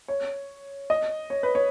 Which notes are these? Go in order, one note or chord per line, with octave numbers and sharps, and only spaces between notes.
C#5
D#5
C#5
B4
C#5